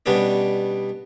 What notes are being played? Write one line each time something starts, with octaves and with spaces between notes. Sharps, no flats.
B2 G3 B3 C#4 D4